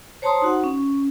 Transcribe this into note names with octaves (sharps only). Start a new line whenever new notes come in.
C5 C#5 A5 A#5 C6 D#6
D#4 F#4 F#5
C#4